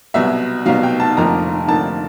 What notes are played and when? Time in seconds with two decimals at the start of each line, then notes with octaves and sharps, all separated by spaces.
0.14 C2 B2 F#3 E5
0.65 C2 B2 F#3 F5
0.83 G5
1.00 A5
1.17 F1 F2 D3 F3 A#3 A#5
1.68 F1 F2 D3 F3 A#3 A5